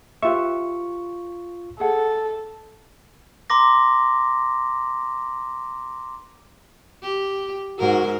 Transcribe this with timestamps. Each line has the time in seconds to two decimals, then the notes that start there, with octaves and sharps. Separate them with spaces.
0.22 F4 G4 B4 E5 C#6
1.80 G#4 A4 F#5
3.50 A#5 C6 D6 A#6
7.02 G4
7.79 G#2 F#4 A#4